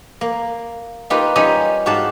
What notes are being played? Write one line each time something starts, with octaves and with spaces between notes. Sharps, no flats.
A#3
A#3 D#4 F4 G4 B4
G3 C#4 D#4 F4 G4 D#5
G#2 F#4 G4 F5 A5